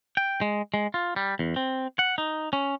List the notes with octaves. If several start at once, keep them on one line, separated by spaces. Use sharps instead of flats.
G5
G#3
G#3
F4
G3
E2
C4
F#5
D#4
C#4